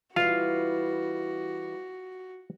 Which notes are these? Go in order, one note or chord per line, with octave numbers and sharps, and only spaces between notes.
E3 G3 F4 F#4 F5